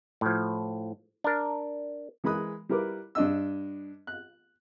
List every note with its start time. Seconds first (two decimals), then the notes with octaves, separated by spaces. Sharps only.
0.21 A2 F3
1.24 D4 A#4
2.24 E3 G#3 A#4 B5 D#6 F#6
2.69 G3 E4 A#4 B4 D6
3.15 G2 D4 D#5 E6
4.07 F#6